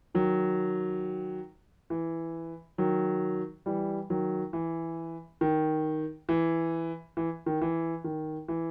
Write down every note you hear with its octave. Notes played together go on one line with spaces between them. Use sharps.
D#3 F#3
E3
D#3 F#3
E3 G3
D#3 F#3
E3
D#3
E3
E3
D#3
E3
D#3
E3